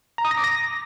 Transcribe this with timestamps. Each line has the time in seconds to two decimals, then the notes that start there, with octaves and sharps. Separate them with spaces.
0.18 A#5
0.25 D#6
0.31 A#6
0.37 D6
0.44 A#6